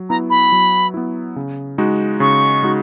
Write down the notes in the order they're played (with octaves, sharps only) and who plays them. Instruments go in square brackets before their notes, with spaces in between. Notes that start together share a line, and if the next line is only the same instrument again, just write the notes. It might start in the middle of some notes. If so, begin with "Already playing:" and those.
Already playing: [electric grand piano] F#3
[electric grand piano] B3 E4 [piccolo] A#5
[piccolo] B5
[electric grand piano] F#3
B3 E4
C#3
G#3 D#4 F#4
[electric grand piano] C#3 [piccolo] C#6
[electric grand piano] G#3 D#4 F#4